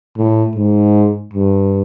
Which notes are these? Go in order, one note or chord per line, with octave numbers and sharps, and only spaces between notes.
A2
G#2
G2